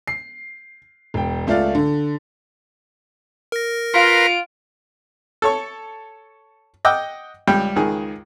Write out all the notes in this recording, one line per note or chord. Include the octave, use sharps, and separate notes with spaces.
C7
E1 G5
C#2 A3 F4 D5 F5
D3
A#4 A#6
F4 B4 A#5 C6 D7
A4 C#5 C#6
D#5 F#5 G5 D6 E6
C#2 G3 G5
C#2 D#3 G#4